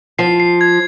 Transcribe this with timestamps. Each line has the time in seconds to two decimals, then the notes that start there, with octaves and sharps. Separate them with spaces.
0.19 F3 C7
0.40 C7
0.61 G#6